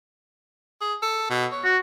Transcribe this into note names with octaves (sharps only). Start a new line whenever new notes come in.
G#4
A4
B2
C#5
F#4